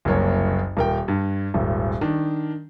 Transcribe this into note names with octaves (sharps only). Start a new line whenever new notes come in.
F#1 C2 A#3 C#5
D#1 A#4 G5
G2
D#1 G#1
D#3 D4